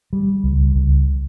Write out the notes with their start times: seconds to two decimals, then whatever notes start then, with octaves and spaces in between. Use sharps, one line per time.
0.13 G3
0.44 C#2
0.76 C#2